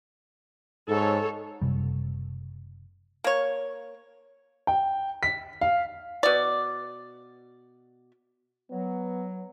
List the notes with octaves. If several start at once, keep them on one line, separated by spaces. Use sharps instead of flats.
G#2 A4 C#5
F#1 B1 C3 G3
A#3 C#5
G5
B6
F5
B2 D5
F#3 B3